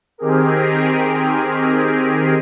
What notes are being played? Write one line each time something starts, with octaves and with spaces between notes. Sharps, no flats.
D#3 C4 G4 G#4 A#4